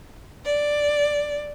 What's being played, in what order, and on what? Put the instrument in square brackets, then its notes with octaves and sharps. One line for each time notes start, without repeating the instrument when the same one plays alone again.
[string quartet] D5